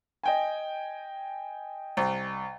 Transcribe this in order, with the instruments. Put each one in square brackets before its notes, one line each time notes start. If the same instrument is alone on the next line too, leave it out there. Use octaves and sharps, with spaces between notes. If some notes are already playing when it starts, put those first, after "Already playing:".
[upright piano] D#5 G5 G#5
[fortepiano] C2